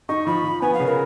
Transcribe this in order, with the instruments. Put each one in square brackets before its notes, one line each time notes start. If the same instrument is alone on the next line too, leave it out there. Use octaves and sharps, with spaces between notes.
[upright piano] D#4 [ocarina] C#6
[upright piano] F3 [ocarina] B5
[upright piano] F3
[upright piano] B3 [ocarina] G#5
[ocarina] F5
[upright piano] C#3
[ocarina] A#4